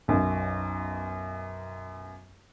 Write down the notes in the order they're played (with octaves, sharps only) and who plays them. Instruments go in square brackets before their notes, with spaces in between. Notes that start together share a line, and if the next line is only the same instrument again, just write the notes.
[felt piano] B1 F#2